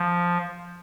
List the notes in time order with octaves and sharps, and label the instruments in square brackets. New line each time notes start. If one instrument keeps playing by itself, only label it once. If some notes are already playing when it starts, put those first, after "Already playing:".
Already playing: [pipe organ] F3